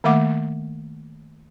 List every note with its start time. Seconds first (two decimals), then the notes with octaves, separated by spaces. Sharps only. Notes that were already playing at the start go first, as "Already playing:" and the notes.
0.04 D#3 A3 A#3 E5 F#5 D6